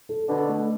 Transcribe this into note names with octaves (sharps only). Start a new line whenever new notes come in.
A4
B2 D3 D4
A3